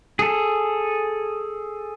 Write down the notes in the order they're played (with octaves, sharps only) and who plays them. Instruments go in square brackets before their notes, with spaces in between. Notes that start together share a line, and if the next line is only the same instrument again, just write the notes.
[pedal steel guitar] G#4 A4